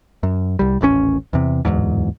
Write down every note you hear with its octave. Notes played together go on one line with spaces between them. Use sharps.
F#2
C2 G3
D#1 A1 A#2 C#4
E2 C3
D1 G1 E2 G#2